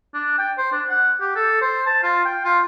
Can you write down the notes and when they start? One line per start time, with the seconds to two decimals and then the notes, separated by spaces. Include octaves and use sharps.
0.14 D4
0.38 G5
0.58 C5
0.72 D4
0.89 F#5
1.21 G4
1.36 A4
1.61 C5
1.86 A5
2.03 F4
2.25 G5
2.45 F4